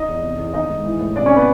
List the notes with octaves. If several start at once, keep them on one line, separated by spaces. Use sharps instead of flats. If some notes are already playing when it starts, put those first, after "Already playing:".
Already playing: D#4 D#5
E2
C3
E2
D#3 D#4 D#5
G#2
E3
A2
C3 D4 D5
C#4 C#5
B3 B4